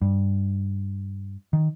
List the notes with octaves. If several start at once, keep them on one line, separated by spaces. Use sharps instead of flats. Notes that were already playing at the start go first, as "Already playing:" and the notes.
G2
D#3